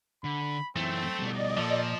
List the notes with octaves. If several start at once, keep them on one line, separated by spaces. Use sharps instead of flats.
D3 B5
F#2 E3 A3 C4
B2 G3 D5 D#5
A#2 F3 A4